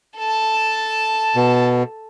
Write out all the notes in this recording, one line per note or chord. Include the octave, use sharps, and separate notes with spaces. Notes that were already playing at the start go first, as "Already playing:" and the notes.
A4 A5
B2